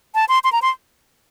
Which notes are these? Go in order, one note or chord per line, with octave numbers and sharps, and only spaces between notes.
A5
C6
C6
A#5
C6